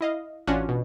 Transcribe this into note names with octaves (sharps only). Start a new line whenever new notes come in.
E4 D#5 F5
A1 C#4 D4 F4 F#4 F#5
B2